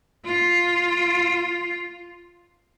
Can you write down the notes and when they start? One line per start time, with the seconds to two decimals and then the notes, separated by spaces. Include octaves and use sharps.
0.25 F4